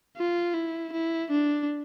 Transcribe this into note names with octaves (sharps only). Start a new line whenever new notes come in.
F4
E4
E4
D4